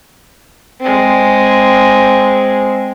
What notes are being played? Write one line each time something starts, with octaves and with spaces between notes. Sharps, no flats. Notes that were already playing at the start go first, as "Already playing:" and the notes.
G#3 C4